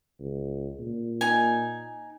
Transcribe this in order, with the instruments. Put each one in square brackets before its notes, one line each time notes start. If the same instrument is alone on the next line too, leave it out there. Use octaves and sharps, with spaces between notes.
[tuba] C#2
A#2
[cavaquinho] D#4 G#5